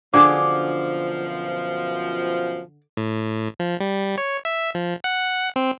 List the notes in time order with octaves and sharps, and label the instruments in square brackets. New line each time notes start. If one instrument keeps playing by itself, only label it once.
[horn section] F#2 B2 F3 [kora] D3 G#4 [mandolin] D6
[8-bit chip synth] A2
F3
G3
C#5
E5
F3
F#5
C4